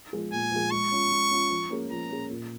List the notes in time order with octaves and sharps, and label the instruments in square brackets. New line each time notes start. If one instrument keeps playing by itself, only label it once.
[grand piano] F3 G#3 F4 G#4
[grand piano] A#2 [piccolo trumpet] G#5
[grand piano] F3 G#3 F4 G#4
[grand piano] G#3 [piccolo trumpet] C#6
[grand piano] C#4 F4
G#3
C#4 F4
F3
A#3 C#4 G#4
[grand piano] F3 [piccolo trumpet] A#5
[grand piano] A#3 C#4 G#4
A#2